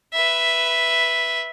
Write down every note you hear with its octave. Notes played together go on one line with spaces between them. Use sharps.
B4 E5